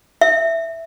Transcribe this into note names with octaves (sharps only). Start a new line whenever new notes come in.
E5